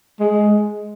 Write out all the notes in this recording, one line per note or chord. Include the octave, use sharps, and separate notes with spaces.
G#3